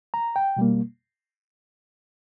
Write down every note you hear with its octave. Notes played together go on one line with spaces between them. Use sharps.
A#5
G5
B2 G3 A#3